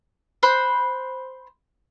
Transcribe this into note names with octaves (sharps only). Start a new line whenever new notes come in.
C5 B5 F#6